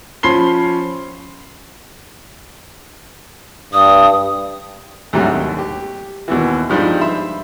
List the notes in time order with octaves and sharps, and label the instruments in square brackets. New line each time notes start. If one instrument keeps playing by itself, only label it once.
[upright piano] F3 C#4 B5 C6 C7 G7
[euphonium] G2 [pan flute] D#6
[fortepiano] D2 G#2 C3 F#3 G3
D#2
G4
D#2 B2 E3
G2 F3 G3 G#3 D#4
E5 B5 C6